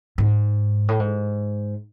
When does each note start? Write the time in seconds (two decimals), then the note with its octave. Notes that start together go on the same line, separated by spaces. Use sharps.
0.18 G#2
0.88 A2
1.00 G#2